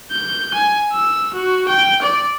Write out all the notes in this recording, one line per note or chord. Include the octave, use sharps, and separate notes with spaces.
G6
G#5
E6
F#4
G5
D5